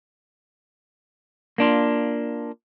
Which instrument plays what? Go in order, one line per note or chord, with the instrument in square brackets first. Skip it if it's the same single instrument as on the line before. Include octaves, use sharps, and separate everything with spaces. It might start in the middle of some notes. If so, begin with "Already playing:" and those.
[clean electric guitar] A#3 D4 F4